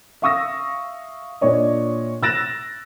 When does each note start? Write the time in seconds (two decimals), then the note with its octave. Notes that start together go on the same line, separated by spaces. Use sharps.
0.22 E5 F5 C#6 D#6 E6 A#6
1.41 A#2 D4 C#5 D#5
2.23 E6 F#6 A6 A#6 D7 E7